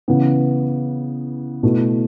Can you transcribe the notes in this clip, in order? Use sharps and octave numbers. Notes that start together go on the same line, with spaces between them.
C#3 E3 B3
B2 A3 E4